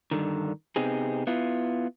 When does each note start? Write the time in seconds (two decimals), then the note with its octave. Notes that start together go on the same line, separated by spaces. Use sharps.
0.11 G2 D3 D#3
0.76 C3 B3 C4 D#4 G4 G#4
1.27 B3 E4 F4